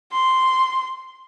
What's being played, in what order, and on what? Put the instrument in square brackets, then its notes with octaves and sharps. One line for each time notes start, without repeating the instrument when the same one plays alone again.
[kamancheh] C6